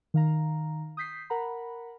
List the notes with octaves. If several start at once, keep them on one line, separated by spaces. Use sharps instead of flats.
D#3 F5 A#5
D#6 G6 B6 C7
A#4 F#5 A#5 B5